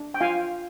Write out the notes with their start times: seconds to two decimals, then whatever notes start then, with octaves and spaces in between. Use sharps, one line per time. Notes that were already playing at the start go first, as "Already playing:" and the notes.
Already playing: D4
0.14 G5
0.21 F4 F5 G#5